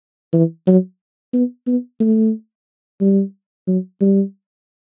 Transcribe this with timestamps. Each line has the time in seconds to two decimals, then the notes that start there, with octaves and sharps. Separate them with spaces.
0.33 E3
0.67 F#3
1.33 B3
1.67 B3
2.00 A3
3.01 G3
3.67 F#3
4.01 G3